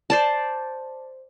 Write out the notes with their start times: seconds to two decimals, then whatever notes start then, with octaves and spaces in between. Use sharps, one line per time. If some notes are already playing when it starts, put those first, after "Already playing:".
0.10 C5 D5 A5